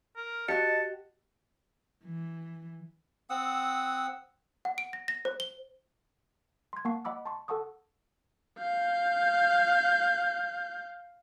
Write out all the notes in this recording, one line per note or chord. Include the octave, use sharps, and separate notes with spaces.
A#4
F#4 G4 D#5 A5 C#7
E3
C4 F#5 D#6 E6
F#5
D7
A#6
A#6
C5
G7
C6 G#6
A#3 F#5 A5 C#6 C7
D#5 F#5 B5 D6 E6
A5 C6 C#6
A4 F#5 A5 C#6 D#6
F5 G6